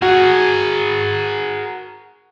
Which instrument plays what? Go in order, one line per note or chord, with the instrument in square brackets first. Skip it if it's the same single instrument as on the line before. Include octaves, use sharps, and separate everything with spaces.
[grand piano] F#4 [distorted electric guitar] G#4 A#4